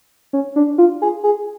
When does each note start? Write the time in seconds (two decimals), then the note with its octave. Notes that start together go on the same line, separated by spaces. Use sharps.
0.33 C#4
0.56 D4
0.78 F4
1.02 G#4
1.24 G#4